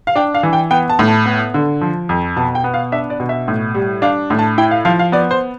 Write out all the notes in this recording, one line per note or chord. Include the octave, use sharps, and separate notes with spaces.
F5
D4 G5
F5
E3
G5
B3 G5
A5
A2
A5
B3
D3
F3
F2
B2 A5
G5
B3
F5
D4 E5
D5
B2
E5
A2
G3
D4 F5
A2
A5
E4 G5
F5
F3 F5
F5
B3 D5
C5